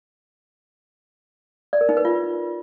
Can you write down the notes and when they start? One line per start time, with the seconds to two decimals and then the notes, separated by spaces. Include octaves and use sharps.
1.73 D5
1.81 A#4
1.89 D#4
1.97 B4
2.05 F4